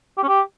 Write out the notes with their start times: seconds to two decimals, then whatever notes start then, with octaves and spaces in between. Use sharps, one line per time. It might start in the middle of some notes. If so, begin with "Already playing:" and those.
0.17 G4
0.23 C#4
0.28 G4